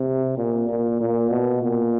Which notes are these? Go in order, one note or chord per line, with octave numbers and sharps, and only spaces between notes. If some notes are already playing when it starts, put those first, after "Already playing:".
Already playing: C3
A#2
A#2
A#2
B2
A#2